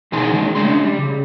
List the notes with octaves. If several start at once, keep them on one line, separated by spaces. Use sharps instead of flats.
C2 B2 D#3 B3 G#4 C6
D#2 D#3 G#3
C#3 G#3 A3 D4 C6
G3
C#3